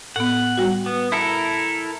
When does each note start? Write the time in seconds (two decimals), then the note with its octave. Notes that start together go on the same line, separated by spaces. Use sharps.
0.16 A2 B3 F#5
0.57 G3 F#4
0.86 B3
1.12 E4 A4 A#4